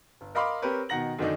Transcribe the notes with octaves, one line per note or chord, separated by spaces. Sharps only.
G1
A#4 D#5 F5 B5 C6 D6
C4 G4 A#4 B4 C#5
B2 D#3 F#5 A#5 A#6 F#7
F#2 D3 D#3 A3 D4 D#4